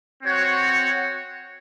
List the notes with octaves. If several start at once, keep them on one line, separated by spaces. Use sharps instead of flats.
C4 F#4 C#5 F#5